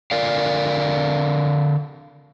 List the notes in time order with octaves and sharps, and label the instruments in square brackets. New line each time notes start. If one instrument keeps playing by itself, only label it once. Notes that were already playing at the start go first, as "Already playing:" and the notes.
[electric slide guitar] D3 A#4 D5 F5